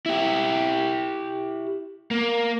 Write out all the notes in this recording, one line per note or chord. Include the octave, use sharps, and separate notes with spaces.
E4 G4
A#3